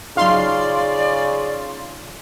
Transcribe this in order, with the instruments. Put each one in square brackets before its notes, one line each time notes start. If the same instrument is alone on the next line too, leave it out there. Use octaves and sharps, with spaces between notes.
[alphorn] C#3 [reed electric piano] F#3 D#4 F4 [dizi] D5 [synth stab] F5 C6